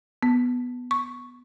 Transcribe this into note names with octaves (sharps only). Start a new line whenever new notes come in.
B3
C#6